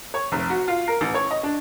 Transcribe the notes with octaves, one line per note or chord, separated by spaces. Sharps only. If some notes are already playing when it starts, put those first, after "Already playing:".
C#5
F1
F#4
F4
A#4
A1
C#5
D#5
D4